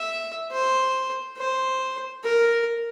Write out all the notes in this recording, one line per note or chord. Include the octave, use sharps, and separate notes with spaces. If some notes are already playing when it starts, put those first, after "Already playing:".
Already playing: E5
C5
C5
A#4